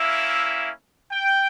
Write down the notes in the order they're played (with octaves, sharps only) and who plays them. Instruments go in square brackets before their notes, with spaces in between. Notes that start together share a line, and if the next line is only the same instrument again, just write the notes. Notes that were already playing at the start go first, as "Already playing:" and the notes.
Already playing: [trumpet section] A#3 C#4 E4 E5
G5